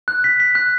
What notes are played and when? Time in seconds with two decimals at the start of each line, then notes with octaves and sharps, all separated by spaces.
0.08 F#6
0.24 B6
0.40 B6
0.55 F#6